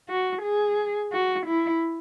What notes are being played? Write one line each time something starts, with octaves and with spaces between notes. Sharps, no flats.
F#4
G#4
F#4
E4